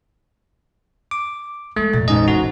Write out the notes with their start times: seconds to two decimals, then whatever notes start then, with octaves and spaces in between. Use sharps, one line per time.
1.11 D6
1.76 G#3 A3 B3
1.93 F2 A#2 A6
2.08 A1 G#2 G#3 D#5
2.28 C#4 F#4